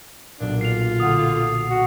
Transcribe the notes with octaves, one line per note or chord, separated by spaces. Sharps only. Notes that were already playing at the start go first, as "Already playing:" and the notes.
B1 A#2 D4
F4 C7 F7
D3 D#6
D#6
F#4